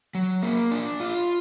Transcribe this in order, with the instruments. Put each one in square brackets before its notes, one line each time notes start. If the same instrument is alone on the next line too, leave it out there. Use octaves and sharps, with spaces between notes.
[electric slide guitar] F#3
A#3
D4
F4